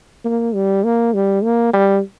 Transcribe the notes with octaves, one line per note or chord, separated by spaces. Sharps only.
A#3
G3
A#3
G3
A#3
G3